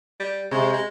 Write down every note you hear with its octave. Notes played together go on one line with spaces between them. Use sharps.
G3
C3 G#3
G#3